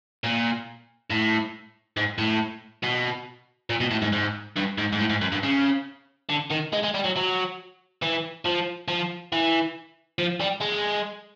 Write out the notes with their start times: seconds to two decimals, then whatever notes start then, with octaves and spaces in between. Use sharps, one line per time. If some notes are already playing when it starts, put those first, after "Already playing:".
0.24 A#2
1.10 A2
1.97 G#2
2.18 A2
2.83 B2
3.70 A#2
3.80 B2
3.91 A2
4.02 G#2
4.13 G#2
4.56 G2
4.78 G#2
4.92 G#2
4.99 A2
5.10 G#2
5.21 F#2
5.32 G2
5.43 C#3
6.29 D3
6.50 D#3
6.73 G#3
6.83 G#3
6.94 G3
7.04 F#3
7.16 F#3
8.02 E3
8.45 F3
8.88 F3
9.32 E3
10.19 F3
10.40 G3
10.61 G#3